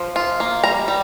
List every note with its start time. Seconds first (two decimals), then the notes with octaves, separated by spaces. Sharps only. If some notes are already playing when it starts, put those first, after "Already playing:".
Already playing: F3
0.16 F4
0.40 A#3
0.64 G3 A#5
0.88 G3